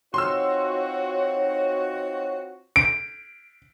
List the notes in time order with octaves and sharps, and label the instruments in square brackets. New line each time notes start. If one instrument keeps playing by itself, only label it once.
[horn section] C4 F4 F#4 [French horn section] D#4 C#5 [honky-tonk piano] C6 E6
[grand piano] D7